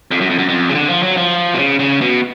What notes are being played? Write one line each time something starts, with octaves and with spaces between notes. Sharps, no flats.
F2
F#2
F2
F#2
F2
C#3
D3
F3
F#3
F3
B2
C#3
C#3
B2